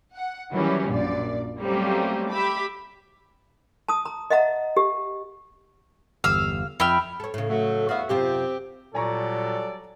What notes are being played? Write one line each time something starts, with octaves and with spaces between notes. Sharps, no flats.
F#5
D#3 E3 F#3 G3 C#4 E4
A#1 F#2 A#2 D5
F#3 G3 A3 A#3 C4 C#4
G4 E5 B5 D6
A5 D#6
A#5
D#5 E5 F#5 A#5
G4
G1 E2 F5 E6
F2 E5 G5 B5 F6
A4 C#5
A2 C#3
F#3 A3
E2 B3 F#4 E5 F5
F#2 C3 C4 F4 G4
A#2 F#3 G3 A4 D5 G#5 A#5 C#6